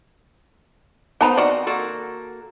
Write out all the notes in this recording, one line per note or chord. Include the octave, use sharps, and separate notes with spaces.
B3 D#4 B4 C5 A5 A#5
D#3 C4 F#4 D5 F#5
A#3 F#4 A4